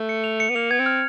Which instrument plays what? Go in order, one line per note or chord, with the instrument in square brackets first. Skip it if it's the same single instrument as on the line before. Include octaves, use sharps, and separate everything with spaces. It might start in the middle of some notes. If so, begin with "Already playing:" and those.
Already playing: [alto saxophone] A3
[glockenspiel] C#7
F7
C#7
[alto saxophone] B3
[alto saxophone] A#3 [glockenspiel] F7
[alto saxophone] B3 [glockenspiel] G#6
[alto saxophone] C4
[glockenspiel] F6